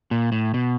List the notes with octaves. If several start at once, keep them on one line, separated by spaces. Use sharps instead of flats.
A#2
A2
B2